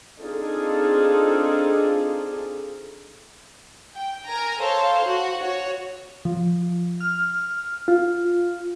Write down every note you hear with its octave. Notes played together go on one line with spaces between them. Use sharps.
C4 D4 D#4 F4 G#4 A4
G5
A#4 G#5 A#5
A4 C5 C#5 F5
F#4
F#4 C#5
F3
F6
F4